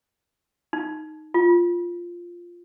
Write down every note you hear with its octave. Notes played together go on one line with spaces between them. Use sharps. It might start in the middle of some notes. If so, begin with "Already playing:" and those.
D#4
F4